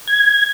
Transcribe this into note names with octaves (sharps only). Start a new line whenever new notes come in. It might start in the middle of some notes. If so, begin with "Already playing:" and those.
G#6